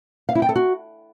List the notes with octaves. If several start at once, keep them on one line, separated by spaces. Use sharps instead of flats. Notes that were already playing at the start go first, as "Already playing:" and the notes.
F5
E4
G5
A4
F#4